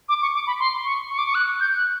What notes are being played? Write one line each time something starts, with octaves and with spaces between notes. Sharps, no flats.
D6
C#6
D6
B5
C6
C#6
C#6
D6
C#6
F#6
G6
F#6